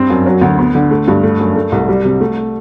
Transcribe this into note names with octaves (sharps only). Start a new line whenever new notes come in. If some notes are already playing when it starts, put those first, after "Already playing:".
Already playing: G2 C4
F#2
F#3
D2
B3
D3
A3
G2
A3
F#2
A3
C2
G3
C3
A3